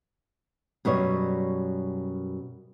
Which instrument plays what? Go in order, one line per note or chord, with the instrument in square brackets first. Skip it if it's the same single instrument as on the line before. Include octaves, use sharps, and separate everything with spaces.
[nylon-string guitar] F#2 B2 G3 C#5